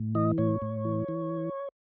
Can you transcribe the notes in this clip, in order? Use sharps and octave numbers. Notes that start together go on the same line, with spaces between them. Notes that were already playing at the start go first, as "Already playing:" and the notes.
Already playing: A2
E3 D#5
A2 C#5
A2
E3
E3